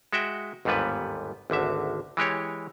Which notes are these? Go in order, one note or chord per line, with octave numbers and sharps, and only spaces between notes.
G#3 F#4 E5 G5
G1 D#2 G#2 G3 B3 B4
G#1 D2 D3 E5
E3 G#3 G4 C#5